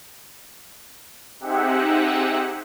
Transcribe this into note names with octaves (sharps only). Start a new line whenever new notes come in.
C4 D#4 G4 G#4 E5 F#5